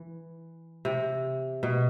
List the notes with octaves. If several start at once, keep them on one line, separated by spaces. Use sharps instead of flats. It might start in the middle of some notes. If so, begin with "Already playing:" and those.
Already playing: E3
C3
B2